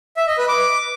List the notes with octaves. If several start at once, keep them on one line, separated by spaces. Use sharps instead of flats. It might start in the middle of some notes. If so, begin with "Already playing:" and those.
E5
D#5
B4
D6